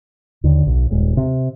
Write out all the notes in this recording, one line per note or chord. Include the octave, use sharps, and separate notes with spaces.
D#2 D3
B1
D#1 G#3
C3